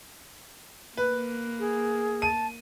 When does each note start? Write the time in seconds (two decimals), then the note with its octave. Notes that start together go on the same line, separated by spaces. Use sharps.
0.97 A#3 B4
1.60 G#4
2.22 A5 D#7